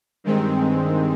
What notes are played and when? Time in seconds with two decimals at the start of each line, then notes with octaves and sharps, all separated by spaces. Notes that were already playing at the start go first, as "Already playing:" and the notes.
0.24 G2 D#3 G#3 C4